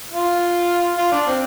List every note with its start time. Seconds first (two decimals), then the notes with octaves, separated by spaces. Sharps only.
0.11 F4
0.97 F4
1.11 D4
1.27 C4